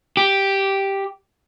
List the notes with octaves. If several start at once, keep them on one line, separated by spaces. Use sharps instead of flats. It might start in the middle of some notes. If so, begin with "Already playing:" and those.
G4